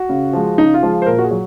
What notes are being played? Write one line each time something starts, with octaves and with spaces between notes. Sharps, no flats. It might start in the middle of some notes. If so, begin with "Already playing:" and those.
Already playing: F#4
C#3
F3 G#3
C#3 D#4
F4
F3 G#3
C5
A#2 A#4
F#4
G#4
F#3